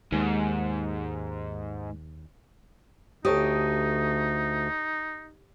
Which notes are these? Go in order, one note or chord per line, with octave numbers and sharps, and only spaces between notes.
D#2 G#2
D2 D#4 G4 A4 C#5 D#6